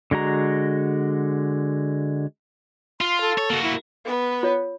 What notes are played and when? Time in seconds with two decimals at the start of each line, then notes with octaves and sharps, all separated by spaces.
0.11 D3 G#3 F#4 A#5
3.01 F4 C6
3.21 A4
3.38 C#5
3.50 A#3 F#4
3.63 E4
4.05 B3 B4
4.43 F4 C#5